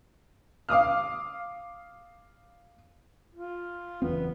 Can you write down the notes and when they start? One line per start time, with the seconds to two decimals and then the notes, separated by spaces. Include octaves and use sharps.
0.69 F5 D6 D#6 F6
3.35 F4
4.02 F#1 E2 B3 C4